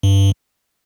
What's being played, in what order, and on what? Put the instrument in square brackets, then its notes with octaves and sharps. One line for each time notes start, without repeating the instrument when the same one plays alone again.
[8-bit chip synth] G2